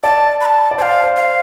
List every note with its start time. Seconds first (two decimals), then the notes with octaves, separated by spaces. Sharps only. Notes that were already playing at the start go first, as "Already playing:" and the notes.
0.03 D5 A5
0.41 B5
0.46 A5
0.71 D5
0.78 C5 A5
0.82 F5
1.04 C5
1.16 F5